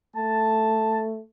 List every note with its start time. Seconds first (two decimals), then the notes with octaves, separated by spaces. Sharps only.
0.16 A3 A5